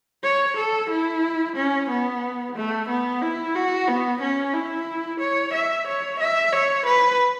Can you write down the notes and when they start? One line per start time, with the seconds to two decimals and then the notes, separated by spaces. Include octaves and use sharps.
0.24 C#5
0.58 A4
0.90 E4
1.56 C#4
1.90 B3
2.56 A3
2.89 B3
3.22 E4
3.55 F#4
3.88 B3
4.21 C#4
4.54 E4
5.21 C#5
5.53 E5
5.87 C#5
6.20 E5
6.53 C#5
6.86 B4